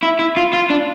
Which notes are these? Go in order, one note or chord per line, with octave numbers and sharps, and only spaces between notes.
E4
E4
F4
F4
D4